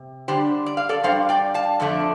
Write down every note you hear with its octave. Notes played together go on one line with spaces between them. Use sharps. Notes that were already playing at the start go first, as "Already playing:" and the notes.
Already playing: C3
D3 G3 D4 G4 C5
D5
F5
A4 D5
G2 G3 D4 C5 F5
D5 G5
F5 A5
F2 D3 F3 A3 D4